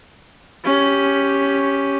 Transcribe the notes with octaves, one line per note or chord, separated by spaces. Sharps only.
C#4 G4